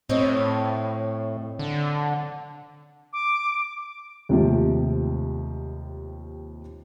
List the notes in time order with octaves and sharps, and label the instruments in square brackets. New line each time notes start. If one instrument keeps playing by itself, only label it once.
[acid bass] A2 [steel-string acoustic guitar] C4 C#5 D#5
[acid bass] D3
[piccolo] D6
[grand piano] D#2 G#2 C3 F3 A3